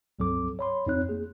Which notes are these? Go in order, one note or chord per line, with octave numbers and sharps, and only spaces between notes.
C#2 G2 F#3 C4 A4 D6
C#5 B5 C6
F2 C4 D#4 C#5 F#6
A#3 G#4